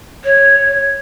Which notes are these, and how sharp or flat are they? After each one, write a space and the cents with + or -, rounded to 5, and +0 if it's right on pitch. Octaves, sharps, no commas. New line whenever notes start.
C#5 -5